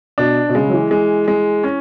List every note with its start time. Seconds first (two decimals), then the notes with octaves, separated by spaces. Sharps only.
0.18 B2 D4
0.49 B2
0.55 C#3 G#3
0.68 F#3
0.73 E3
0.91 G#3
1.28 G#3
1.64 C#4